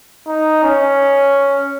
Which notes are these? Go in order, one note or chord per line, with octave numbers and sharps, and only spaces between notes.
D#4
C#4